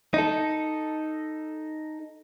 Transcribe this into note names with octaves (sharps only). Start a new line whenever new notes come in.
D#4 A4